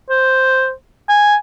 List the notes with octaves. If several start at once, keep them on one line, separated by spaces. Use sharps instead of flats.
C5
G#5